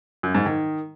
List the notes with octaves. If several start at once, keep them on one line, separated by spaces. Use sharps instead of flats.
F#2
G#2
D#3